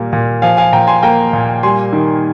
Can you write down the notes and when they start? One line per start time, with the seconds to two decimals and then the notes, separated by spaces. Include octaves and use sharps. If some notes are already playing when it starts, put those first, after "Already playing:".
Already playing: A#2 G3 A#3
0.13 A#2
0.42 F3 F5 G#5
0.57 F5 G#5
0.73 A#2 G5 A#5
0.87 G#5 C6
1.02 A#3 G5 A#5
1.33 A#2
1.63 G3 G#5 C6
1.93 D#3